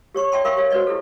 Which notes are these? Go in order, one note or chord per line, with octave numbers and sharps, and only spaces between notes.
G4 C#5 C#6
C#5 D5 E5 G5 A5 C6
A#4 E5 F5 G5 B5 C#6
G4 C#5 F5
F#4 B4 C5 D5 D#5
E4 G4 A4